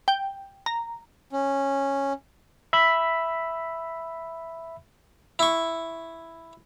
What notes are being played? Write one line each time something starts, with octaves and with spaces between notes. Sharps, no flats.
G5
A#5
C#4
E5 B5
E4 C#6